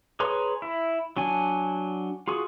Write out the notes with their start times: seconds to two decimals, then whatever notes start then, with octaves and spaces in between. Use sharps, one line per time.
0.20 G#4 B4 C#5 A#5 C6
0.62 E4
1.17 F#3 D4 G#5
2.28 F4 F#4 G#4